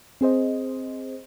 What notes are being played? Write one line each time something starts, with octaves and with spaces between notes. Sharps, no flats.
C4 G#4 C5 D#5